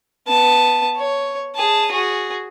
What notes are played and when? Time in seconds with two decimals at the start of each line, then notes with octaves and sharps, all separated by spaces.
0.28 B3 A5
0.97 C#5
1.56 G#4 A5
1.92 F#4 G#4